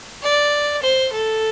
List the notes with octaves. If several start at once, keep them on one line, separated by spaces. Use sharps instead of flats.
D5
C5
A4